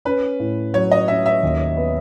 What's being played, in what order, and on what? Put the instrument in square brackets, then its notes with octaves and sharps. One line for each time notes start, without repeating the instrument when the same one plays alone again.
[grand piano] C#4 [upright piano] B4
[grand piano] A2
[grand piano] F#3 [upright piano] C#5
[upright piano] D#5
[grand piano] C#4 [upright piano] E5
[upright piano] E5
[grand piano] D#2
B3